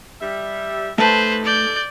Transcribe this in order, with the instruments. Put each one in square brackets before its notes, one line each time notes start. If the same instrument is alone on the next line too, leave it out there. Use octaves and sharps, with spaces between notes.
[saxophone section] G3 E5
[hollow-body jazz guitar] A3 A5 [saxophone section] D#4 G4 A4 [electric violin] B4 C5
[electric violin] D5 G6